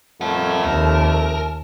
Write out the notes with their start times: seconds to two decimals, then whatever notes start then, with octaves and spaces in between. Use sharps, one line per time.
0.21 F2 A3 A#4 F#5 A5
0.65 D#2 A#4